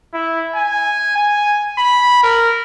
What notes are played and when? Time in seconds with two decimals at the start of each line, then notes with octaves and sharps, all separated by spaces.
0.14 E4
0.56 G#5
1.17 G#5
1.78 B5
2.23 A#4